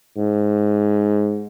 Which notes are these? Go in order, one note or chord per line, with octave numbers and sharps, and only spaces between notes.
G#2